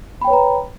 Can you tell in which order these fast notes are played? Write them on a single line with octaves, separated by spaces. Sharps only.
B5 G5 C#5 B4 A#5